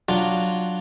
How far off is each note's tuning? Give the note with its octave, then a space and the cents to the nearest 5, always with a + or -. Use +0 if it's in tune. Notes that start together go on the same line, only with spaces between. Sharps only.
F#3 +0 D4 +0 F4 +0